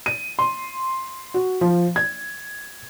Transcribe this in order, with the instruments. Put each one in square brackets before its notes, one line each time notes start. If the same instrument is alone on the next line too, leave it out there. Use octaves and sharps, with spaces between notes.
[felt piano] D#7
C6
F#4
F3
G#6